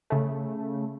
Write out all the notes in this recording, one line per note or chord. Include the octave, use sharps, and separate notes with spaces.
C#3 A3